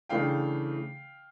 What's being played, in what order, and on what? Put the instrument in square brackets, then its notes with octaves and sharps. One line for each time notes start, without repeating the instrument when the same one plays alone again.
[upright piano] C#3 E3 A3 D4 F5 G5